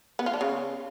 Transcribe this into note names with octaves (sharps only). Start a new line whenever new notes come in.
B3
F4
D4
C#3